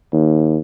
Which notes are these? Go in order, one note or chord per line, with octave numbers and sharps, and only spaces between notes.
D#2